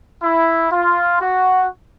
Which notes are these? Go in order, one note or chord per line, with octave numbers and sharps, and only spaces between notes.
E4
F4
F#4